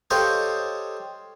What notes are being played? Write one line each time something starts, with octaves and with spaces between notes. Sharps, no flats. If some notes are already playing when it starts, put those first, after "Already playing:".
G4 A4 C5 C#5 D#5 F5